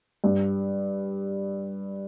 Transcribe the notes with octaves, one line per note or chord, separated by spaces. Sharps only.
G2